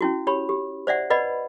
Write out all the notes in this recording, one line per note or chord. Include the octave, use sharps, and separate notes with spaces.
C#4 E4 F#4
G4 C#5 B5
G4
C5 D5 E5 F#5
B4 D5 D#5 F#5 B5